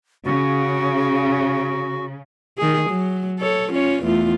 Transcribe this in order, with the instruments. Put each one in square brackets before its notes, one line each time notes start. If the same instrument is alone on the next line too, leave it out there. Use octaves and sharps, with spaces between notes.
[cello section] C#3 [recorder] F#4
[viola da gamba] D#3 G#4
F#3
A4 C#5
C#4 F4 C#5
E2 A3 F4